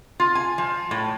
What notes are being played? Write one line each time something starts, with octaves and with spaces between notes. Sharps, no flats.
F4
G#5
F3
A2